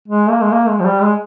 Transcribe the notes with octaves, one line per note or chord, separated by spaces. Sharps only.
G#3
A#3
G#3
A#3
G#3
F3
G3
G#3